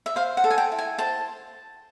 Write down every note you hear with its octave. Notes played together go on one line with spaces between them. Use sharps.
E5
C5 F5
F#5
A4
G#5
G5
E4
G#5
C5 A5